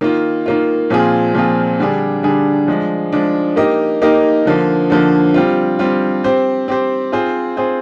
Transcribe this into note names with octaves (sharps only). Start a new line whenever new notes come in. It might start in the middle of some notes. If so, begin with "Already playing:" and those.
D#3 A#3 F4
D#3 A#3 F4
A#2 F3 C4 F4 G#4
A#2 F3 C4 F4 G#4
D3 G3 D4 G#4
D3 G3 D4 G#4
F3 G#3 D4
F3 G#3 D4
A#3 D#4 G4 A#4 D#5
A#3 D#4 G4 A#4 D#5
D3 F3 A#3
D3 F3 A#3
G3 C4 F4
G3 C4 F4
C4 G4 C5
C4 G4 C5
C4 F4 G#4 C5
C4 F4 G#4 C5